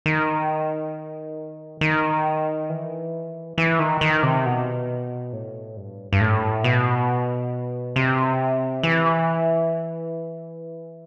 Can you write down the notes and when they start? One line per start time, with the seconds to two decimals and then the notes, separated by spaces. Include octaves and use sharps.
0.06 D#3
1.81 D#3
2.70 E3
3.58 E3
3.79 D#3
4.01 D#3
4.23 C3
4.46 B2
5.33 A2
5.77 G2
6.13 G2
6.21 A2
6.64 B2
7.96 C3
8.83 E3